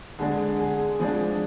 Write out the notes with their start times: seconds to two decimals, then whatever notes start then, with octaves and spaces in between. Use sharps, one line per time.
0.19 D3 G#3 D4 G#4
0.59 G#4
1.00 F3 G#3 D4 G#4